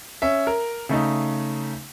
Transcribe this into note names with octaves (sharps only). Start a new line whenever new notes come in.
C#4 E5
A#4
C#3 A3 D#4